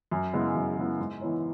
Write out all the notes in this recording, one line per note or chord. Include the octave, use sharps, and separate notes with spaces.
F#2
C#3 G#3 B3 E4
F#2
C#3 G#3 B3 E4
G#2
E3 B3 E4 C#5